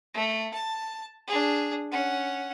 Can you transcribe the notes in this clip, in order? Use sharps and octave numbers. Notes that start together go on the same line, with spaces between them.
A3
A5
D4 G#4
C#4 F#5